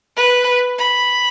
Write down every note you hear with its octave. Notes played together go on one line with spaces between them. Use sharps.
B4
B5